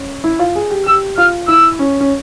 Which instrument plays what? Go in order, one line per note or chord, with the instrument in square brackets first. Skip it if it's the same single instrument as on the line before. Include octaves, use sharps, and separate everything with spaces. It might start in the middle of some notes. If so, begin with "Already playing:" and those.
Already playing: [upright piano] C#4
E4
F4
G#4
G4
[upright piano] G4 [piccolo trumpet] E6
[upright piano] F4 [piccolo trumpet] F6
[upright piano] E4 [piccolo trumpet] E6
[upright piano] C#4
C#4